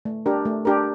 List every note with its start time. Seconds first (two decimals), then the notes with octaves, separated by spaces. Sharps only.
0.05 A3
0.26 D4 G4 A#4
0.45 A3
0.65 D4 G4 A#4